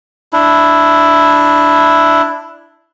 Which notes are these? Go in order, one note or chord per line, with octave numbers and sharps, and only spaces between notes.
D4 E4